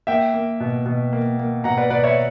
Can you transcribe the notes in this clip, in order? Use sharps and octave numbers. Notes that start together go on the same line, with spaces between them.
A#3 E5 G5
A#3
B2
B2
A#3
A#3
B2 F#5 A#5
B4 D5
B2 B4 D5
C#5 E5